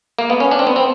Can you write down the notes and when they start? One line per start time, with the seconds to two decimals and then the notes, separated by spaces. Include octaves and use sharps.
0.19 A#3
0.30 B3
0.40 C#4
0.51 D4
0.59 C4
0.67 B3
0.76 C4